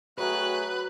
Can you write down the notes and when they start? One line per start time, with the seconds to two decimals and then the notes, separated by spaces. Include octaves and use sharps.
0.18 F#3 A3 F#4 G#4 B4 G5 F#6